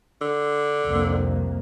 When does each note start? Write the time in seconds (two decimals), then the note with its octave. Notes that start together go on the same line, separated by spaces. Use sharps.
0.21 D3
0.84 C2 F2 A#3